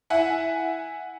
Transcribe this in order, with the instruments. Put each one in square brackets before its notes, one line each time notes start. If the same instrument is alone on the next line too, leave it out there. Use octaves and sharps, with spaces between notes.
[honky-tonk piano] E4 E5 F#5 G#5